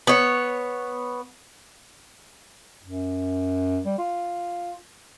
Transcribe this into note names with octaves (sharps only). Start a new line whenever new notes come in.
B3 C#5
F#2
G3
F4